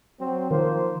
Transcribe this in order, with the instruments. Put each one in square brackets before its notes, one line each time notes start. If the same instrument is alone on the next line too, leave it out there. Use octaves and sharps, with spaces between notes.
[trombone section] F#3 C4
[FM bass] D#3 [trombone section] F3 A#3 C5